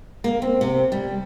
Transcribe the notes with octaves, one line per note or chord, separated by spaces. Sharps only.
A#3
C4
C3
G3